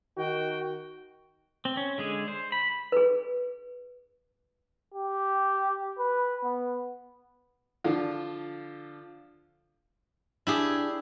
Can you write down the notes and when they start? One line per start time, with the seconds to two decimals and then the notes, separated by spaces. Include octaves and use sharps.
0.17 D#3 F#4 G5
1.65 C4
1.77 C#4
1.98 D3 G#3 G#4
2.28 C5
2.52 B5
2.92 G#4 B4
4.94 G4
5.99 B4
6.44 B3
7.84 D3 F3 F4
10.47 D4 E4 G4 G#4